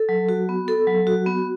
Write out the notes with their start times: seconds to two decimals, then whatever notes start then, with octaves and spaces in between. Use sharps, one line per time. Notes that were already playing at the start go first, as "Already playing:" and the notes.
Already playing: A4
0.09 F#3
0.29 F#4
0.49 B3
0.68 A4
0.87 F#3
1.07 F#4
1.26 B3